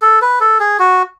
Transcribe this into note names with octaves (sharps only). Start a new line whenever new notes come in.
A4
B4
A4
G#4
F#4